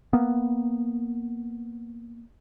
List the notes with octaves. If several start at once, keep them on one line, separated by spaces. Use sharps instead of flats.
A#3 B3